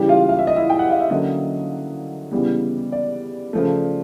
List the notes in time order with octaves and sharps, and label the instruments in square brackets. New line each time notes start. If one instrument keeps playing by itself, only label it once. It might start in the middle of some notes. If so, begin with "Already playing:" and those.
Already playing: [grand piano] C#3 E3 G3 G4
F4 F5
F5
E5
D#5
E4 E5
G5
F#5
F5
E5
D3 F#3 A#3 C#4 D#5
C#3 E3 G3 B3
D5
C#3 F3 A3